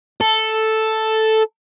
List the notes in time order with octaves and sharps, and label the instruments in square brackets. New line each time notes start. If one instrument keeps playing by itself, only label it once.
[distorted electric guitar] A4